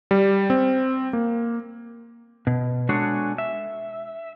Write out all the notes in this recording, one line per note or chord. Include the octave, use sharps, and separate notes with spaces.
G3
C4
A#3
B2
G#3 D4 F#4 G#4 A4 C#5
E5